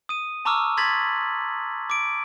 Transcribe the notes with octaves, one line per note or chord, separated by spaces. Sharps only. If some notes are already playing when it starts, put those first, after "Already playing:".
D#6 D#7
A5 A#5 C#6 D6 E6 F6
C6 G#6 A6 B6 F#7
D6 D7